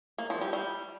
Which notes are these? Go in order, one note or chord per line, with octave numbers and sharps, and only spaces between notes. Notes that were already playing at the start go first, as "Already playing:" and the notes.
A#3
F3
G3
G3